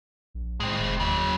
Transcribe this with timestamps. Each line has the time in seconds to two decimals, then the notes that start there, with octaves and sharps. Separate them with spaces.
0.34 A#1
0.60 A2 G#3 C4
0.80 F1
1.00 D#2 C#3 F#3